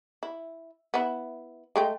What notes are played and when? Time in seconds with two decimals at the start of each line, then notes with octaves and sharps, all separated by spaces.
0.23 E4
0.94 B3 E4
1.76 G#3 A3 G5